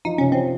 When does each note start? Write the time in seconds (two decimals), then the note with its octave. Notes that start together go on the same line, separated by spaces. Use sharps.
0.05 F3 D#4
0.18 C3 C#4
0.32 F3 C4